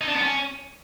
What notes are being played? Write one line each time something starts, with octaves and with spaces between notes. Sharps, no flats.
D#4
D4
B3
C#4